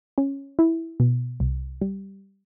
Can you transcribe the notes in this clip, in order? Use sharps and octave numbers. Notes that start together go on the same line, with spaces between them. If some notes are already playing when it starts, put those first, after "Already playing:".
C#4
E4
B2
C2
G3